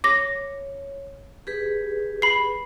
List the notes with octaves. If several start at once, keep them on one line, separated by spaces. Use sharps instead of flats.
C#5 D6 A#6
G4 G#4 B4
B5 C7